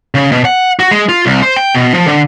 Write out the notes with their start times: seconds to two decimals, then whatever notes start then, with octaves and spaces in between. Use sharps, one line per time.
0.15 C#3
0.32 B2
0.45 F#5
0.79 F#4
0.91 G#3
1.09 F4
1.26 C2
1.42 C5
1.56 G5
1.75 B2
1.94 F3
2.07 D3